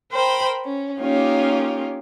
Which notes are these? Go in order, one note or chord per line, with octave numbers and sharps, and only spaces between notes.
A#4 C5 G5 B5
C#4
A#3 C#4 D#4 F4 G4